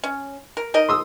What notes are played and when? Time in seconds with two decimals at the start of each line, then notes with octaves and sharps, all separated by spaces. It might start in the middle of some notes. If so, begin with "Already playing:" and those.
0.04 C#4
0.57 A#4
0.74 D#4 A#4 D#5
0.89 C6 D#6 E6